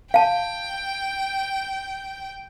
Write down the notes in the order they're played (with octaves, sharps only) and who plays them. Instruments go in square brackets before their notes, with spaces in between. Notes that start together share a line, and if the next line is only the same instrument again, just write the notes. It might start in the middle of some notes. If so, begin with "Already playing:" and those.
[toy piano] F5 A5 [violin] G5